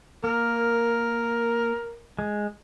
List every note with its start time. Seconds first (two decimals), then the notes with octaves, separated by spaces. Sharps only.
0.24 A#3 A#4
2.19 G#3